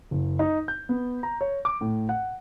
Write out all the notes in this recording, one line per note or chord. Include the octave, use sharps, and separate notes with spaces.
F#1
D#4
G6
B3
A#5
C#5
D6
A2
F#5